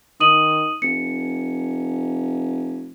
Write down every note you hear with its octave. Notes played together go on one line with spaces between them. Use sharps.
D#3 D#6 D#7 F#7
F1 C#7